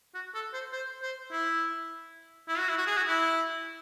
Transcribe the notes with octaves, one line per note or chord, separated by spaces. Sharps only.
F#4
A4
C5
C5
C5
E4
E4
F#4
E4
F#4
G#4
F#4
E4